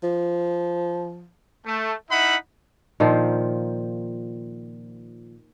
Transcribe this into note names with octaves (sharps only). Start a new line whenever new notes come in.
F3
A3
D#4 E4 E5 F#5 B5
A#2 D#3 F3 C5